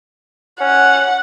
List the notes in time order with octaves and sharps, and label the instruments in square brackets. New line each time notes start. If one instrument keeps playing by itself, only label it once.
[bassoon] C#4 [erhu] F#5